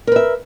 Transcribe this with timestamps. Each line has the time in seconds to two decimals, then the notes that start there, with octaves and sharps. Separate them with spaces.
0.07 A#4
0.12 B4
0.16 E5